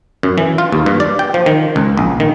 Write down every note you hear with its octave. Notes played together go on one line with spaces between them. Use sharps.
F#2
E3
F4
D#2
G2
D5
G5
F3
D#3
C#2
A#1
D#3